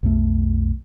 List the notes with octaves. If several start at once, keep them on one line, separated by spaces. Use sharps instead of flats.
B1 F2 A3